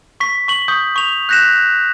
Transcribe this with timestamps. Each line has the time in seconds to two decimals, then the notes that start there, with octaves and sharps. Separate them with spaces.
0.20 C#6 B6
0.48 C#6 F#7
0.68 C#6 D#6 G6
0.96 C#6 F7
1.29 F#6 G6 A#6 B6 E7